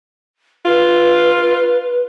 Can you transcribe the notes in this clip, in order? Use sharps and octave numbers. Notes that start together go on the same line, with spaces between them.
F4 B4